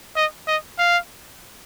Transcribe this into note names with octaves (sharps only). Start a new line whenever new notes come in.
D#5
D#5
F5